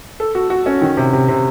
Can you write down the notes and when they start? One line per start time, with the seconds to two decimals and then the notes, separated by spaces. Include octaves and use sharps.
0.20 A4
0.35 F#4
0.50 F#4
0.66 C#4
0.81 D#3
0.97 C3
1.13 C3
1.28 C3